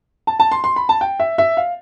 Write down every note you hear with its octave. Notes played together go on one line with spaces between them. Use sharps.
A5
A5
C6
C6
B5
A5
G5
E5
E5
F5